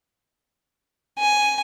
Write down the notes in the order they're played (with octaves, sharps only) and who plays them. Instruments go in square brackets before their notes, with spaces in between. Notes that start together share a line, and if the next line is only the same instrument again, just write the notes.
[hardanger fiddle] G#5